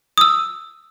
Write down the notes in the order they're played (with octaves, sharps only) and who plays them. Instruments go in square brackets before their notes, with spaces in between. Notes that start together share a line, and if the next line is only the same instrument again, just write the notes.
[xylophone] D#6 E6